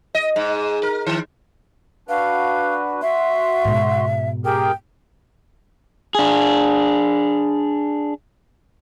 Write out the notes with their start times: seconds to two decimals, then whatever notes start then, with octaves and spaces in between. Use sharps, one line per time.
0.15 D#5
0.36 G#2
0.83 A#4
1.06 D#3
2.09 D4 F#4 B4 F5
3.02 F#4 E5 C6
3.65 G#2 B2
4.45 G4 G#4 A#4 G5
6.15 D4 G#4